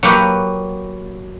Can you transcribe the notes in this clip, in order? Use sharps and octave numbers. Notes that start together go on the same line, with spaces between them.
F#3 A#3 G4 B4